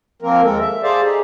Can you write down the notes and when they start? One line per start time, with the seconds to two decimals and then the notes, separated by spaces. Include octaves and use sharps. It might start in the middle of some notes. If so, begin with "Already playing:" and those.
0.22 F3 A#3 C4 A#4
0.43 D#2 G#3 A4 A#4
0.60 E5
0.83 G#4 A4 C5 D5 E5 F5
1.02 D#4 G4 G#4